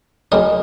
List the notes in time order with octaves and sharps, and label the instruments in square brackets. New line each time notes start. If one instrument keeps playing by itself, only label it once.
[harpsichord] C#3 F#3 C#4 A#4 D#5